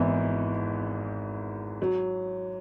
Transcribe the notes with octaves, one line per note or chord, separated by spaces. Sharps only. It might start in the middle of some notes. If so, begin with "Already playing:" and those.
Already playing: G#1 G#2 E3 B3 E4
F#3